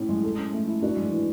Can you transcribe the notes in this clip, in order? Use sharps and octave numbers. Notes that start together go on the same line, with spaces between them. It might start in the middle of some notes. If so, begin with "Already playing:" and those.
Already playing: A2 C#4
G#3
A4
C#4
A3
E4
D4 F#4
G#3
E3